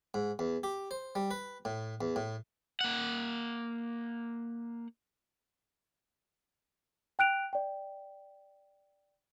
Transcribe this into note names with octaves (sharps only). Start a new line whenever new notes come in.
G#2
E2
G4
C5
G3
B4
A2
E2
A2
A#3 F#5
G5 F#6 D7 F7
D5 G5